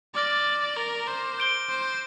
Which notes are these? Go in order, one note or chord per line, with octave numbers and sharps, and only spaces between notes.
D5 D6 F6 A#6
A#4
C5
G6 D7 G7
C5